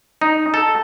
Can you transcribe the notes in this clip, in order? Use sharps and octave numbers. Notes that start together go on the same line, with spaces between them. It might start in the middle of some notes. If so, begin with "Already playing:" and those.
D#4
A4